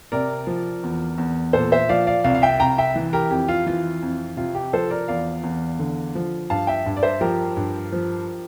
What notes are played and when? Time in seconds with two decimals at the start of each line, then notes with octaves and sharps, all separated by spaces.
0.12 C3 A#4 D5
0.47 F3
0.83 E2
1.18 E2
1.53 A#2 A4 C5
1.72 C5 E5
1.89 F3 D5 F5
2.07 D5 F5
2.24 C2 D5 F5
2.35 F5
2.42 E5 G5
2.60 C2 G5 A#5
2.78 E5 G5
2.96 E3
3.13 G4 A#4
3.31 F2 G4
3.48 F4
3.66 E3 F4
4.02 F2
4.37 C3 F4
4.55 G4
4.73 F3 A4 C5
4.90 A#4 D5
5.08 E2 D5 F5
5.43 E2
5.79 D3
6.15 F3
6.50 G2 F5 A5
6.67 E5 G5
6.86 G2
6.97 D5
7.03 C5 E5
7.21 F3 G4 A#4
7.57 G2
7.92 F3